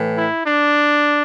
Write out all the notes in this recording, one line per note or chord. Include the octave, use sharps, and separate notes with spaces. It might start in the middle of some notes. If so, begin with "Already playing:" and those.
Already playing: A2 E3
E4
D4